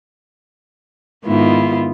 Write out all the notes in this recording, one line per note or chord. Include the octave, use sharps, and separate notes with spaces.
G#2 D#3 B3 E4 F4